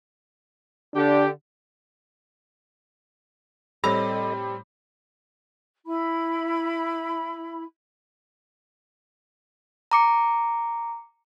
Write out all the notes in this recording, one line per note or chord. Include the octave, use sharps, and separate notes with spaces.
D3 D4 G4
A2 G3 C4 A4 D#5 A#5 B5
E4 B5
A#5 D6 C#7